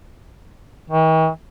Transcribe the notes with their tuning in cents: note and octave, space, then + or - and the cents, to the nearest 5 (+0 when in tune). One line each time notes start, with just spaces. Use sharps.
D#3 +45